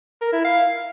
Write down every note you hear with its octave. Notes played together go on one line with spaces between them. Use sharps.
A#4
E4
F5